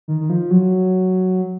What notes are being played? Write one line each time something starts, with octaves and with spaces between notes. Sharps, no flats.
D#3
D#3
F3
F#3